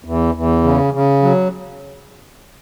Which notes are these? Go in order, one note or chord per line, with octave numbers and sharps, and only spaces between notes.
E2
E2
C#3
C#3
F#3